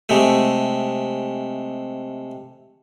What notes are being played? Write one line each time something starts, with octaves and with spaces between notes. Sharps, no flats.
C3 G#3 A3